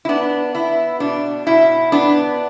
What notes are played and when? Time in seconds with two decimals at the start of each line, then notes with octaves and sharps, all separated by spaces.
0.05 E4
0.09 B3 D4
0.55 B3 E4
1.00 B2 D4
1.47 B2 E4
1.92 B3 D4